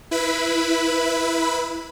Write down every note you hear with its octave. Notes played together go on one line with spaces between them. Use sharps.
E4 B4 B5